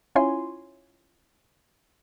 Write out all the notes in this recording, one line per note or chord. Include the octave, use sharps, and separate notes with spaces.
C#4 E4 F4 C#5 G#5 C6